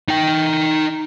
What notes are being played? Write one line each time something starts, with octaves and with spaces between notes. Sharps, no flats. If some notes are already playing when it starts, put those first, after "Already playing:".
D#4 G5